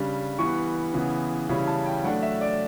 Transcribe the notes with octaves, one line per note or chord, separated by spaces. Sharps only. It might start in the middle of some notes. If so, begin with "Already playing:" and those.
Already playing: C#3 G3 D4
E3 G3 B3 C#6
C#3 E3 B3
C#3 E3 G3 C#4 E4 B5
A5
G5
F#3 A3 D4 F#5
E5
D5